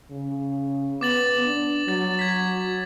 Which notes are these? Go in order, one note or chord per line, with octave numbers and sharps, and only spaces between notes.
C#3
B3 D6 A6 F#7
D4
F#3 A6
G#6 B6